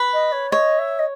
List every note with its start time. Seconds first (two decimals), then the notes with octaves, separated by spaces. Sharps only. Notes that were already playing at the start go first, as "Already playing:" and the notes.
Already playing: B4
0.13 D#5
0.32 C#5
0.51 C#5 D#5
0.79 E5
0.99 D#5